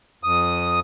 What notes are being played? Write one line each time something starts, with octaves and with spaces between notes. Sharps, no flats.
F2 D#6